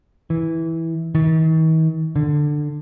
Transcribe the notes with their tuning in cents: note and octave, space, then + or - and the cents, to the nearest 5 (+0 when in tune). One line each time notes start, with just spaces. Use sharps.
E3 -10
D#3 +45
D3 +15